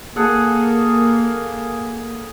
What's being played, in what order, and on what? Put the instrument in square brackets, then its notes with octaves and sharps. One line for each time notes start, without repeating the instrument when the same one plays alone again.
[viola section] A#3 [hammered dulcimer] G#4 A4 F#5